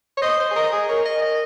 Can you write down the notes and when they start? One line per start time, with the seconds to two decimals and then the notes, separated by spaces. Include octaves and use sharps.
0.17 C#5
0.22 C5 D#5
0.39 C5
0.51 G#4
0.56 A#4 D#5
0.72 G#4
0.89 A#4 C#5
1.05 D#5
1.22 D#5